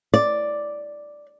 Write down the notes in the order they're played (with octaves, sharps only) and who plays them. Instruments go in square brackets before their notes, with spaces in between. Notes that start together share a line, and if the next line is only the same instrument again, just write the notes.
[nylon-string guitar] D5